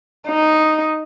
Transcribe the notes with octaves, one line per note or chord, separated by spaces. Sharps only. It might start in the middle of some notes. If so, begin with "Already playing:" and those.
D#4